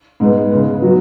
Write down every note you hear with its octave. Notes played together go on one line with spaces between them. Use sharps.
G#2 G#3 B3
C#3 G#3 B3
F#3 B3 F#4